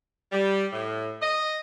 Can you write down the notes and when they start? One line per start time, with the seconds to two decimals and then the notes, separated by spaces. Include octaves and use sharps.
0.32 G3
0.73 A2
1.22 D#5